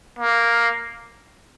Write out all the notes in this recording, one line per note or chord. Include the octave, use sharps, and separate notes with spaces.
A#3